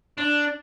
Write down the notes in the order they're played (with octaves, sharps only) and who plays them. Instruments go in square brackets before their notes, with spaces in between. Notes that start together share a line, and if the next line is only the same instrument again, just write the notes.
[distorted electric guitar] D4